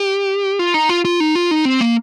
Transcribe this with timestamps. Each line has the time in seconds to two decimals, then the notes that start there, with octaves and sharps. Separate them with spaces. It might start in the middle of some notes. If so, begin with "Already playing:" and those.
Already playing: G4
0.59 F4
0.74 D#4
0.89 F4
1.05 F4
1.20 D#4
1.35 F4
1.51 D#4
1.65 C4
1.81 A#3